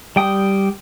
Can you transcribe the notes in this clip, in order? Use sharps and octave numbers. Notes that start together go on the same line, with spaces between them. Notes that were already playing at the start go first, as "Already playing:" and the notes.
G3 G5 D#6